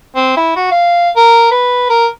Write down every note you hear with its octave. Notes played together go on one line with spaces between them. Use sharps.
C4
E4
F#4
F5
A#4
B4
A#4